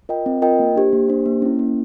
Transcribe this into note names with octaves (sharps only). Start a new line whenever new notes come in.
F4 A#4 D#5 G5
C4
F4 A#4 D#5 G5
A#3
D4 G4 C5
A#3
D4 G4 C5
A#3
C#4 E4
A#3